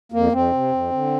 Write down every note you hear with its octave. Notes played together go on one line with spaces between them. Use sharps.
F2 A#3
F2 C4
C3
F2
D3